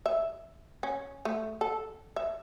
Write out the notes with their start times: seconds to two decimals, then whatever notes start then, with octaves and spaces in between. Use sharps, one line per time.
0.06 E5
0.83 C#4
1.25 A3
1.61 A4
2.16 E5